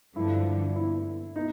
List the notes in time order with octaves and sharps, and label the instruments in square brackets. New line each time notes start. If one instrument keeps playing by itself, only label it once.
[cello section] G2 D3 F3 [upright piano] E4
[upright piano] E4
D#4